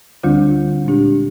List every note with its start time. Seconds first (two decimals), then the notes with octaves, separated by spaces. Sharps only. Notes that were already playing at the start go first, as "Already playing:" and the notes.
0.23 D2 D3 G3 D4 F4
0.84 A#2 G#3 D4 G4